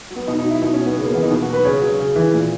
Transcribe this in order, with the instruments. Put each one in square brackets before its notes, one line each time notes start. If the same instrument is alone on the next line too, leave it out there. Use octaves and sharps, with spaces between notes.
[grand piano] F#3
B3
B2 D#4
D#4
F#3
E4
B2 D#4
C#4
F#3
B3
C#3 B3
A#3
E3 B3
D#4
B2
F#4
F#3 B4
C#3 C#5
F#3
C#3
E3
A#2